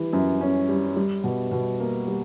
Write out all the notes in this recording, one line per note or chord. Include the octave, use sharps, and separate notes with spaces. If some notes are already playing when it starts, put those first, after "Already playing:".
Already playing: E3 G3
F#2
C#4
G3
G3
B2
B2
A#3
G3